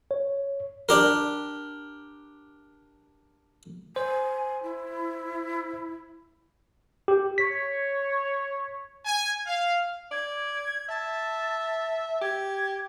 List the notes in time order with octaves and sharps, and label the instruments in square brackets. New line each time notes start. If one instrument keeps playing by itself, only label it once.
[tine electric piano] C#5
[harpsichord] D4 G4 A#4
[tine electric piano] C5 [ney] G#5
[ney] E4
[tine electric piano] G4
[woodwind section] C#5 [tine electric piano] B6
[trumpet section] G#5
F5
[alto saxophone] D5 [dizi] G#6
[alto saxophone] E5 [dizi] A5
[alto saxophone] G4 [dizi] G#6